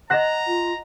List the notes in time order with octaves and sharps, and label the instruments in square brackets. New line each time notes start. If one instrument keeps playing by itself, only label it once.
[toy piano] D#5 F#5 [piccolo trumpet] A#5 [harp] F#6 A#6 E7
[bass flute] F4